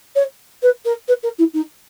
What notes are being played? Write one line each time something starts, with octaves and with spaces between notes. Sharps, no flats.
C#5
B4
A#4
B4
A#4
E4
D#4